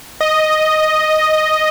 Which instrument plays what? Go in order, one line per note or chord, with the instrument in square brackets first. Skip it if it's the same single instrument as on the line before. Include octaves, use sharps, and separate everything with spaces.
[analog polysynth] D#5